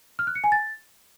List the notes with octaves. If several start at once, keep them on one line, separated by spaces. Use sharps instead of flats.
F6
F#6
C#7
G#5
A6